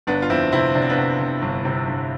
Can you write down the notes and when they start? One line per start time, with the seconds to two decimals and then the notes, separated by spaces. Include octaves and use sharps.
0.07 G1 B3 D4
0.22 F4
0.30 F2 C4 E4
0.52 C3 C4 E4
0.75 C3 D4
0.82 C4
0.90 B3 D4
0.97 C3
1.19 C3
1.42 G1
1.65 C3
1.87 G1